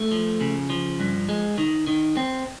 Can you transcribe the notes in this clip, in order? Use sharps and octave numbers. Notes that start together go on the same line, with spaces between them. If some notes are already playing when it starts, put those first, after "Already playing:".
Already playing: A3
F3
C#3
F3
G2
G#3
D#3
D#3
C4